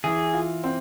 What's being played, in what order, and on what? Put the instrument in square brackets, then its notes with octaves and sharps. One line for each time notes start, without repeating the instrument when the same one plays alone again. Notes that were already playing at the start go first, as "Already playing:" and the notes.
[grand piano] E3 [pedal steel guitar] G#4
[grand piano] F4
C4